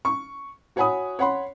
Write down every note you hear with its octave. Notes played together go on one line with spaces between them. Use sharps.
C#6
F#4 C#5 F#5 G#5 B5 D#6
C#5 F#5 B5 C6